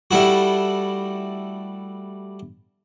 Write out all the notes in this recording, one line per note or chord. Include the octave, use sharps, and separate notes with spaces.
G3 A3 E4 F#4